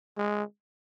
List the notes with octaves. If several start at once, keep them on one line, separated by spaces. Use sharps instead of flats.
G#3